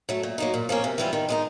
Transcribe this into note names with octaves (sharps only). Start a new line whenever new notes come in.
F#3 A3
A#2
F#3 A#3 D#4
A#2
F3 A#3 C#4
C3
E3 G3 C4 F4
D#3
G#3 B3 D#4